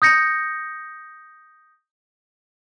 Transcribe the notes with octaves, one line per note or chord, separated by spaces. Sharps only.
D#6 G6 A#6 C#7